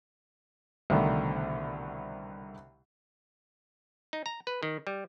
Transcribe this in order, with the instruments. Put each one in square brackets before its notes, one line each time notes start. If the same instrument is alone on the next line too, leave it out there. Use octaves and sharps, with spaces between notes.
[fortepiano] C2 B2 D3 D#3 A3
[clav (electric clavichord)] D#4
A#5
B4
D#3
G3